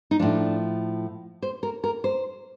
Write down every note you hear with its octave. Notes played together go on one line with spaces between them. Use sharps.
D#4
A2 F3 D4
C5
A#4
A#4
C5